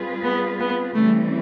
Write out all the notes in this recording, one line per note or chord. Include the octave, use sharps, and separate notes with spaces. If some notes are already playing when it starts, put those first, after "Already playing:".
Already playing: G3 C4 F4 G#4 B4
B3
B3
C#3 E3 G3 A3 C4